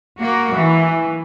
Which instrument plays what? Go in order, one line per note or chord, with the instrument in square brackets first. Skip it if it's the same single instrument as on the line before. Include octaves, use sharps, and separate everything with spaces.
[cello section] A#3 F#4
E3